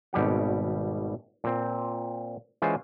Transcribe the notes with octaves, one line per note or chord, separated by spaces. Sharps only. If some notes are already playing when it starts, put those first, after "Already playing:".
G#1 B2 G3 G4 F#5
A#2 C4
E3 G#3 C#4 F4 C5